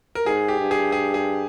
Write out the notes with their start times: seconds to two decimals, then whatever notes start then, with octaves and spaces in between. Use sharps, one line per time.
0.15 A#4
0.26 G#2 G#4
0.48 G4
0.60 G2
0.71 G#4
0.92 G#4
1.14 G#4